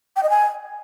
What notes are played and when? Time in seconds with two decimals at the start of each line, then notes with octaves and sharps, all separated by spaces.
0.16 G5
0.23 D#5
0.30 G#5